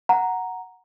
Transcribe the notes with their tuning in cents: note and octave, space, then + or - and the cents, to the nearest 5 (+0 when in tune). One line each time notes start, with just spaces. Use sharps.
F#5 +0 A#5 +0